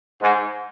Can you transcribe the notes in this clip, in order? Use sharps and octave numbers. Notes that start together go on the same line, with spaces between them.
G#2